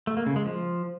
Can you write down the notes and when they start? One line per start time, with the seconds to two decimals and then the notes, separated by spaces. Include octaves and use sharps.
0.07 A3
0.17 A#3
0.26 C#3
0.36 G#3
0.45 F3